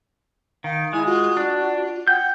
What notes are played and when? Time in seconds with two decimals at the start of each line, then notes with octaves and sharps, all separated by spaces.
0.64 D#3 F5
0.93 G#3 E4 G#5
1.06 F4 F#4
1.37 D4
1.59 F4
2.08 F#5 G5 G6